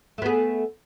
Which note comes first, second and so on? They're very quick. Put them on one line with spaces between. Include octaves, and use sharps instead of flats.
A3 B3 G#4